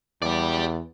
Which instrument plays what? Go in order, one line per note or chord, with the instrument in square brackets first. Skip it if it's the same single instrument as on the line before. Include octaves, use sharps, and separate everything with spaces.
[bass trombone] E2 [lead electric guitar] G4 D5